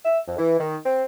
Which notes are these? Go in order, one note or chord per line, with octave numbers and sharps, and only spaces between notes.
E5
F2
E3
D#3
C4